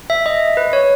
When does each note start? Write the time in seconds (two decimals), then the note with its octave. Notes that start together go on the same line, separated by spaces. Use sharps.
0.10 E5
0.26 D#5
0.57 B4
0.73 C#5